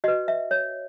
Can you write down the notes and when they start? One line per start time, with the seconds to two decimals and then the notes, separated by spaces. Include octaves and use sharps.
0.04 F#4 B4 D#5
0.28 E5
0.51 C#5